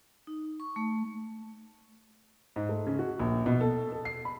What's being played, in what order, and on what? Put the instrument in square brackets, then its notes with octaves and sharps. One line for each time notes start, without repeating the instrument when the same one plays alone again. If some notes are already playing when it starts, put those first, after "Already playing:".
[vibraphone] D#4
C#6
A3
[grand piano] G#2
A3
C#3
F#4
A#1
B2
A4
A4
C7
B5